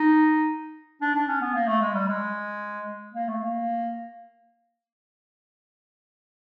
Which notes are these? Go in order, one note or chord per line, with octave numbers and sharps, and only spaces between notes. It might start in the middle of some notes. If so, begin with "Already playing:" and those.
Already playing: D#4
D4
D4
C#4
B3
A#3
A3
G#3
G3
G#3
A#3
A3
A#3